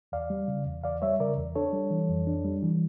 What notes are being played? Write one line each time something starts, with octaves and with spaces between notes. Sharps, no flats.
E2 D5 F5
G3
C#3
E2
E2 D5 F5
G3 C#5 E5
C#3 A#4 D5
E2
D4 A4 C#5
G3
E3
F2
D4
G3
E3